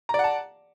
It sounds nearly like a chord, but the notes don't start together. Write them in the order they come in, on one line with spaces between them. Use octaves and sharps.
A#5 D5 F#5 A5